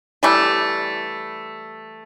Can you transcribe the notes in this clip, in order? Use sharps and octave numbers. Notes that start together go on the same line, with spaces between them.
E3 G3 A3